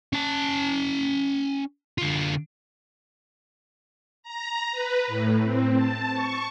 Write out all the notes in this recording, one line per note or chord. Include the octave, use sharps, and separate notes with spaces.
C#4 A5
D3 F4
A#5
B4
A2
C4
A5
C#6